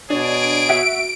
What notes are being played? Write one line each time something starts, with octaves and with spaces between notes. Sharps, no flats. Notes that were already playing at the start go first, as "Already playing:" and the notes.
B2 D4 G#4 C#5 D7
F#4 E5